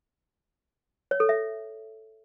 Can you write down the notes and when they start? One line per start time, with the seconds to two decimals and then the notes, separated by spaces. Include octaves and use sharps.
1.11 C#5
1.20 A4
1.29 E5